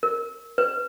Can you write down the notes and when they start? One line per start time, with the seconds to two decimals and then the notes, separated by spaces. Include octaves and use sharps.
0.03 A#4
0.58 B4